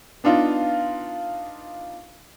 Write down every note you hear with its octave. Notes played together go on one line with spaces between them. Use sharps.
B3 D4 D#4 F4